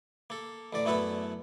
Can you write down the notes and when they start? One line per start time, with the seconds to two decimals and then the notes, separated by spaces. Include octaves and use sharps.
0.30 A#3 A4
0.73 A1 D3 D5
0.85 F#2 A3 B3 E4 A4 B4